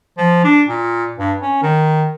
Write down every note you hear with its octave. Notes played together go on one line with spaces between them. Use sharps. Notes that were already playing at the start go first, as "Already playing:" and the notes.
F3
D4
A#2
G2
C#4
D#3